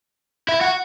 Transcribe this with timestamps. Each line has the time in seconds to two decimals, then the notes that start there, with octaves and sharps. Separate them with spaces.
0.49 E4
0.61 F#4